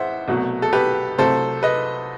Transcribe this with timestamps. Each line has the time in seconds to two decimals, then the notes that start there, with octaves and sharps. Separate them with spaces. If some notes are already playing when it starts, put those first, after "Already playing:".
Already playing: A1 E3 C5 E5 F#5
0.28 C2 B2 F#3 A3
0.62 A4
0.73 G4 B4
1.18 C2 C3 F#3 A3 A4 C5
1.63 B4 D#5